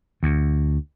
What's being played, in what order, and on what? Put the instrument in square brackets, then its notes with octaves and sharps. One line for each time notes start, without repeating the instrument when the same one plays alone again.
[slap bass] D2